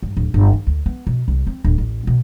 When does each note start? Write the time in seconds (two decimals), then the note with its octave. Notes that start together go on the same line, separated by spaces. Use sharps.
0.03 G2
0.17 D1
0.34 G1
0.53 D#3
0.67 D2
0.86 B3
1.07 B2
1.28 C2
1.47 C4
1.65 D1
1.78 A1
2.07 B2